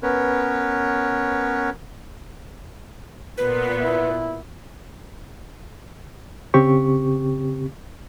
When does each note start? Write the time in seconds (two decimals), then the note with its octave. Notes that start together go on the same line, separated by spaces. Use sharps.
0.03 B3 C#4 A#4 B4 C#5
3.38 A#2 B3 B4
3.81 E4
6.54 C#3 C4 G4 C#6